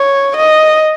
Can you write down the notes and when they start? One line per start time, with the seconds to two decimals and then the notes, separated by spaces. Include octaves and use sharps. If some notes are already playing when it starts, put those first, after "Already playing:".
Already playing: C#5
0.36 D#5